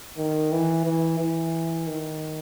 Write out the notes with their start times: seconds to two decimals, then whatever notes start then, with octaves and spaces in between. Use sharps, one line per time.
0.18 D#3
0.52 E3
0.85 E3
1.19 E3
1.87 D#3